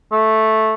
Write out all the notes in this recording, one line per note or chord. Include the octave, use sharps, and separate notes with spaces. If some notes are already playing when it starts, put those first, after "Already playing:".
A3